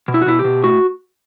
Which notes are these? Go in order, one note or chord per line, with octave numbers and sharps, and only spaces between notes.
B2
E4
F#4
B2 E4
G4
B2
A2 F#4